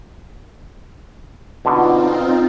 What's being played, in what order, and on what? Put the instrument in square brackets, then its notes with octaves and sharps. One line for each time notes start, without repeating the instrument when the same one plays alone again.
[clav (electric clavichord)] B2 D3 [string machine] C4 D#4 F4